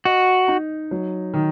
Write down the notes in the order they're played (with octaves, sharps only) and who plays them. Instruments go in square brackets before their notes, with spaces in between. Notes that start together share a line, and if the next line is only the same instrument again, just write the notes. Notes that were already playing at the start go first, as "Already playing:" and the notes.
[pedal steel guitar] F#4 [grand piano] D#5
[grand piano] D#4
F#3
D#3